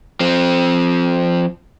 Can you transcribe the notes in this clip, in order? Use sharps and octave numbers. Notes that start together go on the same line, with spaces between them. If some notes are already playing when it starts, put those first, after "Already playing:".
F3 C4